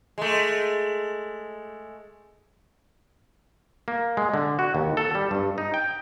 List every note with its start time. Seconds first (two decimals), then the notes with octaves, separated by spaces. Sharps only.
0.18 G#3 A3
3.88 A#3
4.17 G#3
4.34 D3
4.59 F#4
4.75 D#2
4.97 A4
5.15 G3
5.31 G2
5.58 D#4
5.74 G5